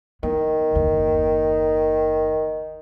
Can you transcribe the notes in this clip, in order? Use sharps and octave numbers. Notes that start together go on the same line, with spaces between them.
D#3 B3
F#1 D#2